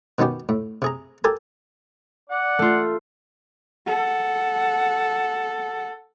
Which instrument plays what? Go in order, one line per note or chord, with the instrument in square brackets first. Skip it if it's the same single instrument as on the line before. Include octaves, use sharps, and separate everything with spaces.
[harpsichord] B2 D#3 B3 C#4 G4
A2
C3 G#4 A#5
G4 A4 A#4 G#5
[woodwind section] D5 F#5
[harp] A3 F4
[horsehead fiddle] A4 F#5